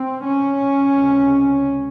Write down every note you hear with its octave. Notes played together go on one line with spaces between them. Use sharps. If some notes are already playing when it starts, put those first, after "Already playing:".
Already playing: C4
C#4
C#2 C3